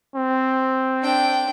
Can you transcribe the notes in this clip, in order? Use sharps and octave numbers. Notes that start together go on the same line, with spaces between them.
C4
D4 G5